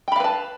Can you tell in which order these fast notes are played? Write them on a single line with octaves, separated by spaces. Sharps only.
G5 B5 F5 B4 A5